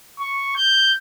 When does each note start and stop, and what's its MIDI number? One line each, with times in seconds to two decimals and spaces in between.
0.20 0.53 85
0.56 0.93 91